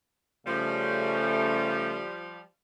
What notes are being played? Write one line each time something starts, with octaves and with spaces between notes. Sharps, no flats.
C#3 F3 G3 A3